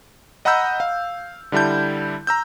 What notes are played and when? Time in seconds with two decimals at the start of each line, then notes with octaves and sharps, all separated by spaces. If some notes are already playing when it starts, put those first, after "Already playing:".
0.45 D#5 F#5 A#5 B5 E6 G6
0.80 F5
1.52 D3 G3 E4 A5 G6
2.27 A#5 E6 G6